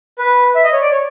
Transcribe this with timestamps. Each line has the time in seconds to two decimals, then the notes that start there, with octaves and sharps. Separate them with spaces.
0.19 B4
0.55 E5
0.64 D#5
0.73 C#5
0.82 D5
0.91 C#5